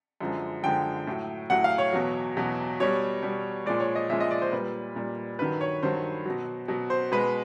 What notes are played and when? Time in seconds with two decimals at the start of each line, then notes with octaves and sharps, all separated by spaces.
0.21 F#2 D3 F3 G#3
0.63 F#2 D3 F3 G#3 G5
1.07 A2 F#3
1.50 A2 F#3 F#5
1.64 F5
1.78 C#5
1.93 E2 B2 F#3
2.37 E2 B2 F#3
2.80 B2 G3 C#5
3.23 B2 G3
3.66 A#2 F3 G#3 D5
3.80 C#5
3.95 D#5
4.10 A#2 F3 G#3 E5
4.20 D#5
4.31 D5
4.42 C5
4.52 A#2 G3 B4
4.96 A#2 G3
5.39 G2 D#3 F#3 B4
5.61 C#5
5.83 G2 D#3 F#3 C5
6.26 B2 F#3
6.68 B2 F#3
6.90 C5
7.11 B2 G#3 B4